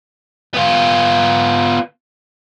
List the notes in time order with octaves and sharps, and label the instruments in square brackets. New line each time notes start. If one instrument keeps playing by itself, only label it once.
[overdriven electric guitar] B3 F4